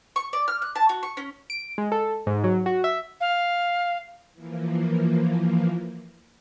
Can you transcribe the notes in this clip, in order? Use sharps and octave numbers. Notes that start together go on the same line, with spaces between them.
C#6
D5
F6
F#6
A5
F#4
C#6
C#4
D7
G#3
A4
G#2
F#3
F#4
E5
F5
E3 F3 A#3